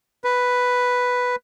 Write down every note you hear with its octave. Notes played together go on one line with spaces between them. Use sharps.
B4